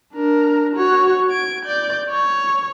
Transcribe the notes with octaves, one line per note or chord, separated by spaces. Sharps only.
D4 A#4
F#4 C#5
G#6 D7
D5 G6
C#5